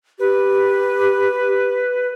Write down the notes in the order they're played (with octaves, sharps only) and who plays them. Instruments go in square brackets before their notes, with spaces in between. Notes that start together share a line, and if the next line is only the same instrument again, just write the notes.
[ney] G4 [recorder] B4